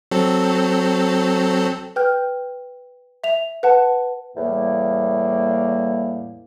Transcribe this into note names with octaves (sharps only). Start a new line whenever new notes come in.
F#3 C4 A4
B4 G5 F6 G6
E5 F7
B4 F#5 A5
E2 A2 G3 A#3